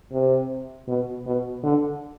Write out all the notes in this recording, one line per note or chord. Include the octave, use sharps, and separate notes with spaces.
C3
B2
B2
D3